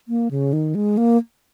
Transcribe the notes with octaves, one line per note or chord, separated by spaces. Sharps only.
A#3
C#3
D#3
G#3
A#3